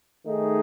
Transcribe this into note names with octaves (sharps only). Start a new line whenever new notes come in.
D#3 A3 D#4 G#4